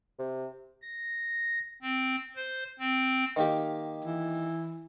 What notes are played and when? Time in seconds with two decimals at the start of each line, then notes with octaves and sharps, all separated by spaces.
0.19 C3
0.82 A#6
1.82 C4
2.36 C5
2.79 C4
3.36 D#3 A#3 G4
4.05 E3